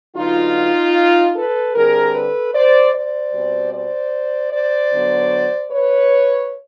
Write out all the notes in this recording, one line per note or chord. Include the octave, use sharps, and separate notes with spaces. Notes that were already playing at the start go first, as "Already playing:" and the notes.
D3 F#3 B3 D#4 F4
A4 B4
D3 G3 C4 G#4 A#4
A4 B4
C5 D5
C5 D5
B2 G3 C4
C5 D5
C5 D5
D3 F#3 B3
B4 C#5